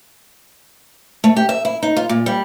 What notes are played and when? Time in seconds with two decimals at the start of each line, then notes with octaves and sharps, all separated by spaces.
1.24 A3
1.37 G4
1.49 E5
1.65 E4
1.83 D#4
1.97 F4
2.09 A#2
2.26 G3